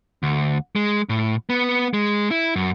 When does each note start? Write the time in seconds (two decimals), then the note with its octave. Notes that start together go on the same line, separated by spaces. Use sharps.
0.23 D2
0.75 G#3
1.09 A2
1.50 B3
1.93 G#3
2.31 E4
2.56 F#2